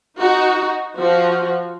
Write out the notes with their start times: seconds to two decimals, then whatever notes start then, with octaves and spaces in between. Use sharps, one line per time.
0.19 D#4 F#4
0.99 F3 F4 F#4